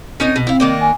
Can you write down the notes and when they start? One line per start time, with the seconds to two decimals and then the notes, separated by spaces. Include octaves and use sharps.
0.20 C4 C#4 D#4 A#4
0.36 B2
0.47 C4 E4 F5
0.60 D#3 A#3 D4
0.81 G#5